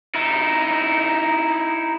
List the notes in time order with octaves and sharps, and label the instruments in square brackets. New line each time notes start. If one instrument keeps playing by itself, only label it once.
[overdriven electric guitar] D#4 E4